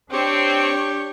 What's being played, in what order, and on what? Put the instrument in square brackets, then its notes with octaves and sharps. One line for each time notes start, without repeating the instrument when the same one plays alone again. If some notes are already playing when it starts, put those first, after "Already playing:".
[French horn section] C4 [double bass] D4 [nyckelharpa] G4 [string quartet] C#5 C#6